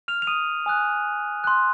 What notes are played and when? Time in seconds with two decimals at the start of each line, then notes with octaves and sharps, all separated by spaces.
0.08 F6 F7
0.22 F7
0.27 D#6 D#7
0.66 G#5 D#6 F#6
1.44 C6 F#6